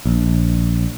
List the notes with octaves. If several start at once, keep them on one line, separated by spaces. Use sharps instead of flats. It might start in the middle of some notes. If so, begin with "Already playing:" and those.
A#1